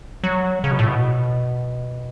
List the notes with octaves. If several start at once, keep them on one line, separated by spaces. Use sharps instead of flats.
F#3
C#3
B2
A2
B2